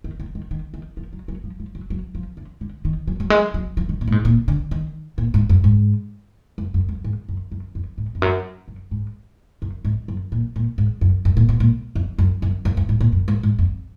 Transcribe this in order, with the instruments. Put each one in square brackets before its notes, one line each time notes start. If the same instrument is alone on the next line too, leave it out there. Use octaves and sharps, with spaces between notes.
[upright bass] D#3
D#3
D#3
D#3
D#3
F3
F#3
F#3
F3
F3
F#3
F#3
F3
D3
D3
D#3
F#3
F#3
G#3
F#3
F3
D#3
B2
A#2
G#2
A#2
D3
D#3
A#2
G#2
F#2
G#2
F2
F#2
F2
G#2
F#2
F#2
F2
G#2
F2
F#2
F#2
G#2
F#2
G#2
F#2
A#2
A#2
G#2
F#2
F#2
A#2
B2
A#2
F2
F#2
F#2
F#2
F#2
G#2
A#2
F#2
G#2
G#2
F2